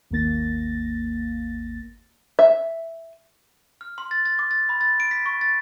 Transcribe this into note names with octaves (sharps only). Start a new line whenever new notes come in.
G#1 D#2 A#3 A6 A#6
E5
F6
C6
A6
A6
D6
A6
B5
A6
D7
B6
C#6
A6